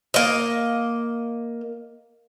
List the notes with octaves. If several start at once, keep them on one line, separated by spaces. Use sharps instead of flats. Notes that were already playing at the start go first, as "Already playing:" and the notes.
A#3 D#5